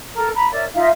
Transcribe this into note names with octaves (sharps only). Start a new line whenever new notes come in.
A4 A#4 A#5
A#5 B5
A#4 C#5 D5 E5
D#4 F4 E5 F5